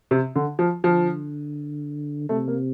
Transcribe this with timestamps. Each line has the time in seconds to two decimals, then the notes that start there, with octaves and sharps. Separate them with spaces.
0.11 C3
0.36 D3
0.59 F3
0.84 D3 F3
2.29 C3 A3
2.48 A#3